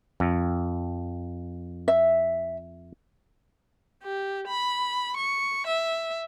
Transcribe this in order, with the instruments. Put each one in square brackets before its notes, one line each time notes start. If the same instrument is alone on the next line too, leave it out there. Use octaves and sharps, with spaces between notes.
[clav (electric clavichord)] F2
[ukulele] E5
[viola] G4
B5
C#6
E5